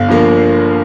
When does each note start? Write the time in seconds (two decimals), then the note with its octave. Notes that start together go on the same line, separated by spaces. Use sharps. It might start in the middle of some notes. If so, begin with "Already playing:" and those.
Already playing: G1 F5
0.08 G2 F3 A#3